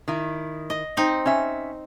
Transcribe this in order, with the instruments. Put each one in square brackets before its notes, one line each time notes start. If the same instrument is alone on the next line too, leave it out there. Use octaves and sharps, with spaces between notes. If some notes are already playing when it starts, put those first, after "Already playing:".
[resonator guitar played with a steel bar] D#3 E4
[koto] D#5
C4 D#4
[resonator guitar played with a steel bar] C#4 E5